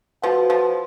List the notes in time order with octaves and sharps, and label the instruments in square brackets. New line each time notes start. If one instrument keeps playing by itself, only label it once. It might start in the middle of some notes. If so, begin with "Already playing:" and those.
[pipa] F3 [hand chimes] F#4 B4 F#5
[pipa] F3